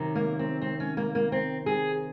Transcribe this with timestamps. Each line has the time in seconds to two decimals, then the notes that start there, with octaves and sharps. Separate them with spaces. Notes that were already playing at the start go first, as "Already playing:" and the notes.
Already playing: C3 D#3 F#3
0.15 A#3
0.39 C4
0.62 C4
0.80 C#4
0.97 A#3
1.15 A#3
1.32 C4
1.66 G#4